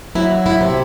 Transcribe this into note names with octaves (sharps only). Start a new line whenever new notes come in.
F#3 E4
E4
C3